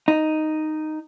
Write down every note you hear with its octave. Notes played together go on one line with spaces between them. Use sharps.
D#4